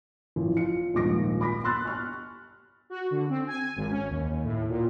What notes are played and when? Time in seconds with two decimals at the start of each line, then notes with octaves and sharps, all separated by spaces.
0.36 A1 F3
0.57 F4 C#7
0.94 D#1 A#1 G#2 D6 A#6
1.41 B5 D6 A#6 B6
1.64 B5 C6 E6 F#6 A6
1.85 C#6 F6 F#6
2.90 F#4
3.11 D3
3.30 C4
3.47 G#5
3.76 G#1
3.90 C#4
4.10 D#2
4.30 D#2
4.44 A2
4.69 A#2